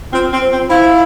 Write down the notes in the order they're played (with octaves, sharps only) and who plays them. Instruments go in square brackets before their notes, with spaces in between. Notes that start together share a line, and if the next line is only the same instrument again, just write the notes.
[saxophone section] C4 [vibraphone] F4
[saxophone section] C4
[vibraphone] C5
[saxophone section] C4
[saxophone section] E4 [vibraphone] F5